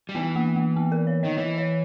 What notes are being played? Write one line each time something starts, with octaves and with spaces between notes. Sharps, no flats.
G3
E3 B3
A#3
A#3
B3
A#4
C#5
D#3 D#5
E3 C#5
C#5